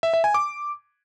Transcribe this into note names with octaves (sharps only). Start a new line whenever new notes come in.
E5
E5
G#5
D6